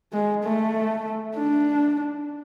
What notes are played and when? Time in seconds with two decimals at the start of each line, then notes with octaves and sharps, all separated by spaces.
0.13 G#3
0.44 A3
1.36 D4